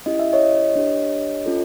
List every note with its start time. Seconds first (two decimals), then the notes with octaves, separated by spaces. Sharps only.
0.06 C#4 E4 G4 D#5
0.19 E5
0.33 C#5 D#5
0.76 D4 G4
1.46 C#4 F4 A4